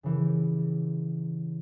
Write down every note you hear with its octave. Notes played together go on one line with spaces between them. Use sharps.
C#3 E3 G4